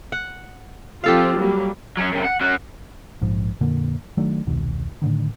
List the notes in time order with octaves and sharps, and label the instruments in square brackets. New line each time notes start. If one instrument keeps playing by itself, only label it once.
[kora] F#5
[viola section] F3 C4 F4 [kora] G4 A4 F5
[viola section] F#3 G3 A#3
[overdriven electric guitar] F#3 C#4
F#2 C3
F#5
C#4 F#4
[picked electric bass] A#1 G#2 F3
F2 A#2 D3 A#3
D#3 F#3 A3 D4
E1 C2 B2 D#3
A2 D3 D#3